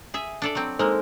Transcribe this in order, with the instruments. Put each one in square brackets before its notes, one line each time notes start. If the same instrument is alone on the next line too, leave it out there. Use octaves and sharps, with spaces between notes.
[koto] G#4 E5
D4 A4 D5
F#3 C4
[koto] G#3 A#3 [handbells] D#4 A4 C5